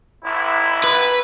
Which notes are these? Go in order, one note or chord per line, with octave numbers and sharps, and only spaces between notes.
G#1 E4
B4